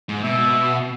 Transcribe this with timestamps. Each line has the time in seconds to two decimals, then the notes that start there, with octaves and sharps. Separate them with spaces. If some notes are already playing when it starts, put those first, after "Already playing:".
0.09 G#2
0.23 B2 E5